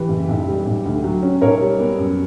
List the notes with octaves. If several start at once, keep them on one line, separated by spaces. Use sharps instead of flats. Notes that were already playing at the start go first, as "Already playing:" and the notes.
Already playing: E3 G4 B4
F#1
B1
G3
B1
D2
F#3
C#4
B1 A#4 C#5
G3
B3
F#2